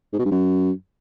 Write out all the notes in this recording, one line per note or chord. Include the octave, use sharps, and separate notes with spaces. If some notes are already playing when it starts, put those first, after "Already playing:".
G#2
B2
G2
F#2